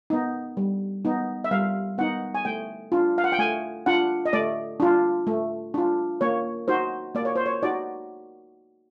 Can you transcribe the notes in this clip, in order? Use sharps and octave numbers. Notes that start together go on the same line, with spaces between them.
B3 D#4
G3
B3 D#4
E5
G3 F5
B3 D#4 F#5
G#5
A3 G5
D4 F4
F5
F#5
G5
A3 G#5
D4 F4 F#5
D#5
A3 D5
D4 F4
A3
D4 F4
A#3 C#5
D#4 F#4 C5
A#3 D5
C#5
C5
C#5
D#4 F#4 D5